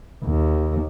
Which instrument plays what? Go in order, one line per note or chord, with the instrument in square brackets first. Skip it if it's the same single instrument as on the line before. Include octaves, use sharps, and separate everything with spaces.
[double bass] D#2